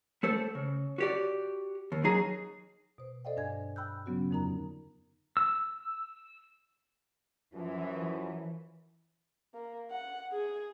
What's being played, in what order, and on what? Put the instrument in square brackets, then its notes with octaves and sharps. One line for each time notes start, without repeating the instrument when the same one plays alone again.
[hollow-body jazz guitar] A3 A4 C5
C#3
F#4 G4 D5
D#2
F#3 D#4 G#4 A#5
[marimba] B2 C5
A4 C5 D5 D#5 F5 G5
G2 D4 G#5 G#6
G5 B5 E6 F#6 G6
C#3 F#3 B3 C#4 F#4
F2 D3 D#4 A#4 A#5
[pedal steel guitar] E6
[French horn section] F#2 F3 [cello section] E3
[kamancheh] A#3
F#5
G#4